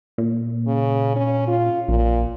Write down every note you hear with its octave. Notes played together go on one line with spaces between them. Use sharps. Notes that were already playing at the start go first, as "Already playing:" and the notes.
A#2
C#3
C#4
F4
A#1 A#2